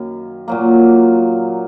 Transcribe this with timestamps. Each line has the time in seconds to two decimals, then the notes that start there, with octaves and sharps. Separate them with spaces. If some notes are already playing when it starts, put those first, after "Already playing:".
Already playing: F#2 D#3 A#3
0.48 A#2 F#3 A#3